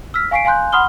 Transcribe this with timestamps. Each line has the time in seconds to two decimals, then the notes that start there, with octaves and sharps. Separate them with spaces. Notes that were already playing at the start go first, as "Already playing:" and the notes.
0.14 E6 F6 B6
0.31 F5 G#5 C#6 B6 C7 D7
0.45 F5 G#5 C6 F#6 G6
0.72 F#5 B5 C6 D#6 F6 G7